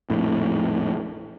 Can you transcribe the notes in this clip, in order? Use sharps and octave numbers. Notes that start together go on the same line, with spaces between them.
A#1 F2 A2